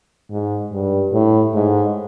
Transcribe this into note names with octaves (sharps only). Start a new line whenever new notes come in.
G#2
G2
A2
G#2